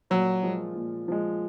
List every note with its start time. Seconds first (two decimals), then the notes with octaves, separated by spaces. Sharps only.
0.10 A#2 F#3
0.43 F3 G#3
0.75 A#2
1.08 F3 G#3